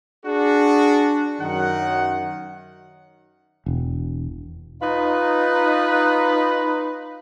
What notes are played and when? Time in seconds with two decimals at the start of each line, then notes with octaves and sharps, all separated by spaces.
0.25 D4 F#4 G#4
1.40 F#2 D#3 F#5
3.66 E1
4.82 D#4 F4 B4